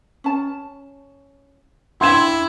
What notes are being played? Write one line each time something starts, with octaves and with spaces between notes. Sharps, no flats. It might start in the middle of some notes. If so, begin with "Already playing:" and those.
C#4 A5
D4 E4 F5 G5 C6 G#6 E7